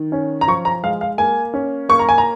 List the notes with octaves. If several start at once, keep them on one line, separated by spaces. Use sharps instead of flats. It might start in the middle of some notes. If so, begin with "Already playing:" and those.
Already playing: D#3
C#4
A#5
F3 C#6
A#5
G#3 F5
F5
A#3 G#5
C#4
A#3 C#6
A#5
G#5
A#5